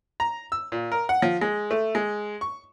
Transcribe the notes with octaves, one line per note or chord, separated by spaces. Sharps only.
A#5
E6
A#2
A#4
F#5
F3
G#3
A3
G#3
C#6